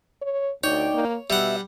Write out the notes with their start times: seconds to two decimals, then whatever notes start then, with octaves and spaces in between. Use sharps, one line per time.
0.22 C#5
0.64 D2 D#4 C#5 D5 G5
0.94 A#3
1.30 B2 G3 E5 F#5